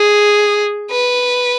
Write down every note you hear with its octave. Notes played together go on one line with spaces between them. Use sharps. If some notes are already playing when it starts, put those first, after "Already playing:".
Already playing: G#4
B4